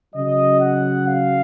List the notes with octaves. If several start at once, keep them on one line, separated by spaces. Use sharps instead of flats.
C#3 F#3 D#5
F#5
F5